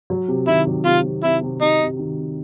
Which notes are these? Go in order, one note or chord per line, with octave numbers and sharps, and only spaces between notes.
F#3
C3
D#3 E4
F#3
C3 F4
C3
C3 E4
C3
C3 D#4
C3
D#3
C3